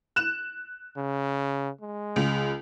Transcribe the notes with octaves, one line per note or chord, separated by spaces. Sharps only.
F#6 E7
C#3
G#3
C#2